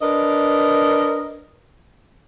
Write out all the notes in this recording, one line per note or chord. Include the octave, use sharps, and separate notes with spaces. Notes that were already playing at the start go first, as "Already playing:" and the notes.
D4 A#4 B4 D#5